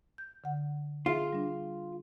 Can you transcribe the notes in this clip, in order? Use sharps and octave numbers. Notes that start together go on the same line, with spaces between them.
G6
D3 F#5
F4 G#4 E5 F6
G3 D4